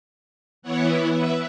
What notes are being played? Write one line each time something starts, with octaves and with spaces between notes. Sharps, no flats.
E3 B3 E4 C#5 F#5
B4 E5